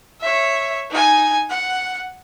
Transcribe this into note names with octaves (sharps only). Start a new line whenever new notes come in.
C#5 E5
D#4 G#5
F#5